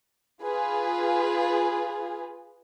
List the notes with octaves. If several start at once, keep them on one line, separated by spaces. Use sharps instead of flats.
F4 G#4 B4